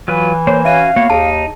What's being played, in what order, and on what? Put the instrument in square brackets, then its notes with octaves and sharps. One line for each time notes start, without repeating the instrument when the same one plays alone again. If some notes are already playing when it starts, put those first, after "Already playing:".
[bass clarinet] E3 [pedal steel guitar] F#3 F4 B4
[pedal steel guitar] A#3 C5 [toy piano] C#5
[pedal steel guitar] C#4 F#4 G#5 [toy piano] E5 [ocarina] F5
[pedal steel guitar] A#3 F#4 C#5 [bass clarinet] B3
[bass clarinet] D#2 [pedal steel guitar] D#4 [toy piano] G#4 A5